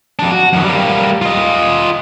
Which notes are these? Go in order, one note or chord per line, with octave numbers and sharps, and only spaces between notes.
F2 D4
F#4
F#2 D#3
G3 A#3
F4 D#5